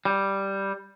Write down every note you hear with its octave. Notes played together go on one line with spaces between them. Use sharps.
G3